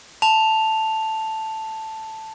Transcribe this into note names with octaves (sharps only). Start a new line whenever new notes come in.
A5 F7